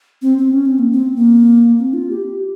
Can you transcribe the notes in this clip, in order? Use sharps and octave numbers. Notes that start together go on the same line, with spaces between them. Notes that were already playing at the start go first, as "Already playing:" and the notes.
C4
C4
C#4
C4
A#3
C4
A#3
C4
F4
G4